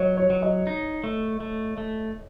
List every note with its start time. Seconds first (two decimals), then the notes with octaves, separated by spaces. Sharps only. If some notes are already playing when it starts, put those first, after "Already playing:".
Already playing: F#3 C#5 D#5
0.17 C#5
0.30 F#3
0.42 D#5
0.67 D#4
1.04 A3
1.40 A3
1.78 A3